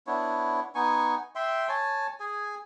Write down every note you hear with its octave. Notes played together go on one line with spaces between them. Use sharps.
B3 D4 E4 C#5
B3 D#4 G#5 C#6
E5 G5 C6
C#5 G#5 A5
G#4 G#5